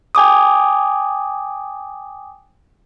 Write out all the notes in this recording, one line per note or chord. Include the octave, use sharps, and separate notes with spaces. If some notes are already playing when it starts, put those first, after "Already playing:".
G5 G#5 D6 D#6